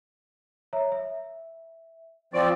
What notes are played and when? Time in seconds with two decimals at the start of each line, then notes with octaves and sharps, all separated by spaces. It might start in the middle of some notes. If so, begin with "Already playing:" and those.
0.73 C#5 E5 A#5
0.92 E5
2.33 F3 C4 D5 C#6 D7